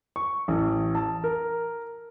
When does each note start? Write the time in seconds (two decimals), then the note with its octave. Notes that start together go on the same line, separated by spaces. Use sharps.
0.16 C#6
0.48 A1
0.95 A5
1.24 A#4